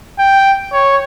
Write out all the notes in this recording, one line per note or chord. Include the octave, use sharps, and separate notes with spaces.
G5
C#5